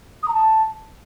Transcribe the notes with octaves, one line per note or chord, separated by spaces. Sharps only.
D#6
A#5
A5